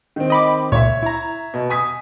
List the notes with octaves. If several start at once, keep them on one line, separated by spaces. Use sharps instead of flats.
D#3 C4
D#5 B5 D6
C#2 A#2 C#5 E5
E4 A#5
B2
G#5 D#6 B6